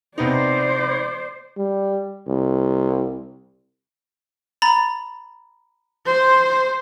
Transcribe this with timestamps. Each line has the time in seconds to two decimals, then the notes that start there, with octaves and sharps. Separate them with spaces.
0.18 C3 B3 D#4 C5 D5
1.57 G3
2.28 C2
4.62 A#5 B5 A6
6.06 C5